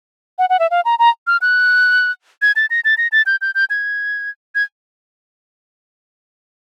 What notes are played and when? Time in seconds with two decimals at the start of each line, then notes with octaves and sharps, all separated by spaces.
0.39 F#5
0.50 F#5
0.60 E5
0.71 F5
0.85 A#5
0.99 A#5
1.27 F6
1.42 F#6
2.42 G#6
2.56 A6
2.70 A#6
2.85 A6
2.98 A#6
3.12 A6
3.26 G6
3.41 G6
3.55 G6
3.70 G#6
4.55 G#6